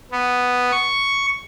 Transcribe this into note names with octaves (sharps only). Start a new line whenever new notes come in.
B3
C#6